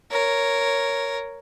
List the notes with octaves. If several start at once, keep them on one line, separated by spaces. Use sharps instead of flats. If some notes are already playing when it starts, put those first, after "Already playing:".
A#4 C#5